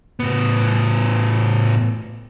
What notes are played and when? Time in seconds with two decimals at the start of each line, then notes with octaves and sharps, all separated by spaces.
0.20 A2 B3